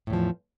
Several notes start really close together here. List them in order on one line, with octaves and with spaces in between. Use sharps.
A2 E2 F3